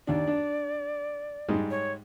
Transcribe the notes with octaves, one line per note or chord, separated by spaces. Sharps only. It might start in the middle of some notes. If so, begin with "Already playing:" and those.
D#2 D4 D5
D4
G#2 G3 G#3
C#5